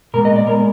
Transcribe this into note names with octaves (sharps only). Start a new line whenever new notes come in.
A#2 G#3 B3 A#4
D#5
D5
A#2 G#3 B3 A#4